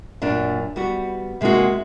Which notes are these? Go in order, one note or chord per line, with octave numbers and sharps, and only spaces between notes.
F#2 A#2 D4
G3 B3 F#4
C3 G#3 A#3 D#4 F#4